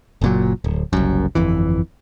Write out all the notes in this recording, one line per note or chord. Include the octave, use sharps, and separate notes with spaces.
F#1 A#2 F#3
D1
F#1 C2 F#2
G1 F2 E3